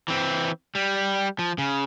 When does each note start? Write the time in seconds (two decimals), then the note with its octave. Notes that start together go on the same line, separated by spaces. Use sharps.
0.08 E3 C4
0.75 G3
1.39 F3
1.58 C#3